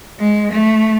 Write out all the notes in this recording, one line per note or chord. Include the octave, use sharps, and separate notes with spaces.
G#3
A3